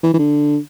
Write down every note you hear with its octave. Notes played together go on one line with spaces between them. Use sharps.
E3
E3
D3